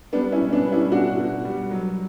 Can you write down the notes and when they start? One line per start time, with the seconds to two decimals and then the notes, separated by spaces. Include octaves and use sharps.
0.13 G3 B3 D4
0.32 C#4 E4
0.40 B2
0.52 B3 D4
0.66 G3
0.72 C#4 E4
0.92 B2 D4 F#4
1.19 B2
1.45 G3
1.71 F#3